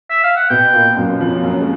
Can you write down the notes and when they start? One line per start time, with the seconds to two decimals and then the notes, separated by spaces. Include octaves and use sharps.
0.10 E5
0.23 F5
0.36 F#5
0.49 B2 B3 G5
0.73 A#2 A#3
0.97 F#2 F#3
1.20 F2 F3
1.43 F#2 F#3
1.61 G#3